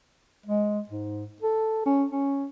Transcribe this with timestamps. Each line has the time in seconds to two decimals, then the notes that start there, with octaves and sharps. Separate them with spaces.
0.46 G#3
0.89 G#2
1.42 A4
1.86 C#4
2.11 C#4